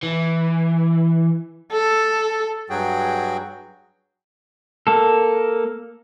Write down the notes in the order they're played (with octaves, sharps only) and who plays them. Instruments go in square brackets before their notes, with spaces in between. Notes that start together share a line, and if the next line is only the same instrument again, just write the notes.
[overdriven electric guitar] E3
[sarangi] A4
[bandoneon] G2 F#3 F#4 G#4 G5
[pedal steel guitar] A#3 A4